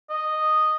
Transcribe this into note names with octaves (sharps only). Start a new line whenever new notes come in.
D#5